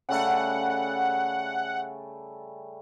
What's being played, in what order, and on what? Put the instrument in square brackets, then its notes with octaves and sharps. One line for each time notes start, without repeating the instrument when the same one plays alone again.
[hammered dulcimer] C#3 G3 A3 [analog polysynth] F#5